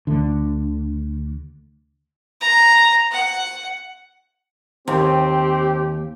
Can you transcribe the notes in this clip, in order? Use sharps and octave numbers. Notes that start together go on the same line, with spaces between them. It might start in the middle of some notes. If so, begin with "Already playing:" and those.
D2 D3
A#5
F#5
D#2 C4 G4